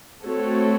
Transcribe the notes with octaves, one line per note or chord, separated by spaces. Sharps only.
A3 C4 F#4 A4 C#5